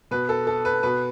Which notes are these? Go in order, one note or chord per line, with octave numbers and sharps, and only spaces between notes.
B2 B4
A4
A4
B4
B2 B4